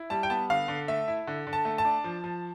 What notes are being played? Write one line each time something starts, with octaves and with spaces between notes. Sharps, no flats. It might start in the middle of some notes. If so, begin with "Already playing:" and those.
Already playing: E4
G3 A5
G5
B3 A5
D3 F5
D3
A3 E5
E4
D3
D3
A5
A3
A5
D4
F3
F3